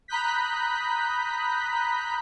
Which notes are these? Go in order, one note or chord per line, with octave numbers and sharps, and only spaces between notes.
A#5 B5 D#6 F#6 G6 B6